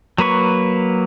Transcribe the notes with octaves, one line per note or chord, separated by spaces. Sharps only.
F#3 A#3 B4 C#6